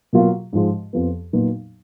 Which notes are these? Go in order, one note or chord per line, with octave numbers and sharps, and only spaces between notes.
B2 F#3 A#3 F4
G#2 F3 G#3
F2 F3 B3
A#2 F#3 B3 D#4